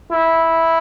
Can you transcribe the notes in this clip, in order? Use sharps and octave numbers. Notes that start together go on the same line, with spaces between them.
E4